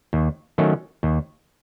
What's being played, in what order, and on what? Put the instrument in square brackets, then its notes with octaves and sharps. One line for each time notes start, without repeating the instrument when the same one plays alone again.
[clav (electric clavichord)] D#2
D#3 F#3 A3 C#4
D#2